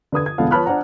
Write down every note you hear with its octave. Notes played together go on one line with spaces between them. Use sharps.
D3 B4 D#6 G#6
G#6
E1 D3 B3 A4 F5
B4 C#5 A5 B5 F6 F#6
D4 C5 F#5 A#5